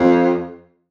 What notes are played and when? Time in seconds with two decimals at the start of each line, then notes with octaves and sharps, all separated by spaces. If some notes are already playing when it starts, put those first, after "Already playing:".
Already playing: F2